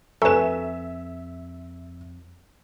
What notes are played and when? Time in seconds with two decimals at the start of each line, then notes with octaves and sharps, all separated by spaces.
0.22 F2 A4 B4 E5 G#5 A#5 C#6 E7